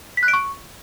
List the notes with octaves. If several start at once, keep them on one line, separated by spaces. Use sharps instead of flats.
B6
F#6
D7
C#6